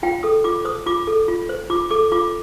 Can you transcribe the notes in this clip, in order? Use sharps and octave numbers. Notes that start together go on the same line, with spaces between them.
F4 G5
A4 D#6
F4 D6
C5 D#6
F4 D6
A4
F4
C5
F4 D6
A4 D6
F4 D6